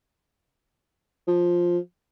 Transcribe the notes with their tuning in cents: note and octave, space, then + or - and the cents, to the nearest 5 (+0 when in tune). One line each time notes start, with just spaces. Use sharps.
F3 +5